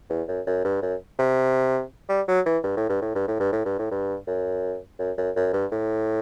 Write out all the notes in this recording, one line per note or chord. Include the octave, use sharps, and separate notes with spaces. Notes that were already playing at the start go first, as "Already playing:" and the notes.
E2
F#2
F#2
G2
F#2
C3
G3
F#3
E3
G2
A2
G2
A2
G2
A2
G2
A2
G2
A2
G2
F#2
F#2
F#2
F#2
G2
A2